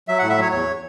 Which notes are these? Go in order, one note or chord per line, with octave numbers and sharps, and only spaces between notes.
F#3 E5
A2 F#5
E5
F#3 C#5
E2 C#5